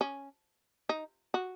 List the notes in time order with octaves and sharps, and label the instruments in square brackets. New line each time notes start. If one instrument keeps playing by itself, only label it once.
[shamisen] C#4
D#4
F#4